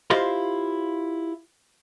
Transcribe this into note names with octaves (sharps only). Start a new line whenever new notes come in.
E4 F4 G4 C5 D#5 F5